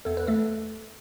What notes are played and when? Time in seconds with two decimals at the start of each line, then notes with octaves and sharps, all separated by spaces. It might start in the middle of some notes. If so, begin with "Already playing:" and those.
0.05 E2 A4
0.17 B4
0.27 A3 A4